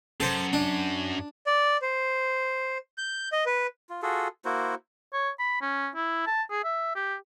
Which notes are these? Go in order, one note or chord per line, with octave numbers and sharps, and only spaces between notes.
F#2 A4 C5
D4
D5
C5
G6
D#5
B4
F4
F4 F#4 G#4 A4
A#3 E4 F#4 C5
C#5
B5
C#4
E4
A5
G#4
E5
G4